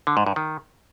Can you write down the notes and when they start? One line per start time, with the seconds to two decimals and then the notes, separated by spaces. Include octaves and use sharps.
0.07 D3
0.17 G#2
0.26 G2
0.36 D#3